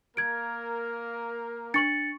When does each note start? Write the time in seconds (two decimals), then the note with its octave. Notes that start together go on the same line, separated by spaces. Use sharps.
0.17 A#3 A#4 G#6 D7
1.74 D4 C#6 A6 C#7 F#7